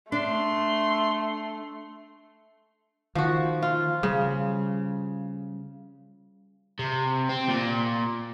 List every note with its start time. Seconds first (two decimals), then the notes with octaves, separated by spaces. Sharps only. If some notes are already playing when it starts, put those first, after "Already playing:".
0.12 A3 D4 C6
3.15 D#3 F3 F#4
3.62 F4
4.03 C#3 G3
6.79 C3
7.29 C4
7.49 A#2